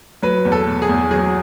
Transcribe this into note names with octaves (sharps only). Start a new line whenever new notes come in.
F#3 B4
E2
A4
B2
G#4
E2
F#3 G#4